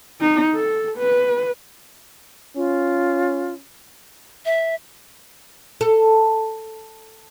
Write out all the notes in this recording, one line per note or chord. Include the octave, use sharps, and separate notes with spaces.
D#4
A4
B4
C#4 F4
E5
A4